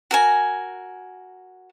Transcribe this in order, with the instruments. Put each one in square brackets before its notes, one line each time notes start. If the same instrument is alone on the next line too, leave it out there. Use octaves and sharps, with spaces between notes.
[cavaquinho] F#4 A#4 G#5